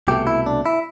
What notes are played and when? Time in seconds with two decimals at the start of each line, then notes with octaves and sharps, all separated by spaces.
0.08 C2 B2 A3 G4
0.27 E4
0.46 D4
0.66 E4